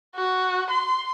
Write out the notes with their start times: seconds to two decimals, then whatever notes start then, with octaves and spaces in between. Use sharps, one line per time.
0.15 F#4
0.70 C6